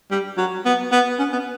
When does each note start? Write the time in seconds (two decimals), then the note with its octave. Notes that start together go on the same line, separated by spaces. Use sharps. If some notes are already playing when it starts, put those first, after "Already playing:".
0.11 G3
0.37 F#3
0.65 B3
0.91 B3
1.19 C#4
1.32 B3